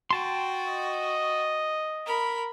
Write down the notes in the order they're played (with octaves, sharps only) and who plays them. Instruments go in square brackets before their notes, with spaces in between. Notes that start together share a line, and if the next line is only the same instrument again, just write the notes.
[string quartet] F#4 [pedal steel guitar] G5 A5 C6
[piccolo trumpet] D#5
[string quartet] A#4 B5